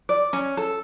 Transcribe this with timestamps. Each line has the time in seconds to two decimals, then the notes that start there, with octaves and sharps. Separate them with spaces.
0.09 D5
0.33 C#4
0.57 A4